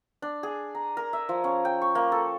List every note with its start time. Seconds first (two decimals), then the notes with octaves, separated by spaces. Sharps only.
0.22 D4
0.43 G#4
0.75 A#5
0.97 A#4
1.13 E5
1.29 F3
1.44 C#4
1.65 G5
1.82 C#6
1.95 A#3
2.12 A4